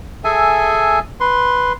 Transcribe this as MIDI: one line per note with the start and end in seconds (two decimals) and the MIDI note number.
0.24 0.99 68
0.24 0.99 69
0.24 0.99 76
0.24 0.99 80
1.20 1.72 71
1.20 1.72 84